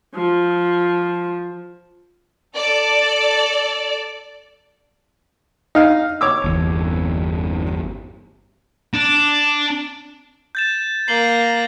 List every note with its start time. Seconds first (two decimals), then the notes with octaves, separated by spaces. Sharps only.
0.15 F3
2.56 A4 D5
5.75 D#4 F5
6.21 C#5 D6 E6
6.44 G1 E2
8.94 D4
10.55 G6 A6 E7
11.08 A#3 A#6 C7 F#7 G7